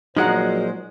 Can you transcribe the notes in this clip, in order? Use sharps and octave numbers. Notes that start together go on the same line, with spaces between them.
A#2 F3 F#3 G#3 D#4 C5 F#5